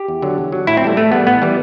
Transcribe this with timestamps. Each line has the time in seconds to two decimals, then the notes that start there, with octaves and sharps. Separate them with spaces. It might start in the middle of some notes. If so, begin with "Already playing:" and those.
Already playing: G4
0.08 E2
0.22 D3 F#3
0.38 E2
0.52 D3 F#3
0.67 A2 E4
0.77 C4
0.82 E3 G3 A3
0.97 A2 A3
1.12 E3 G3 B3
1.27 A2 B3
1.42 E3 G3